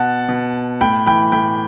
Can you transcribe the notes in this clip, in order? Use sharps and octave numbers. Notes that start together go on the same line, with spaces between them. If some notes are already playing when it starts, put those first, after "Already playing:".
Already playing: B2 F#5 A5
B2
A2 G5 B5
E3 G5 B5
A2 G5 B5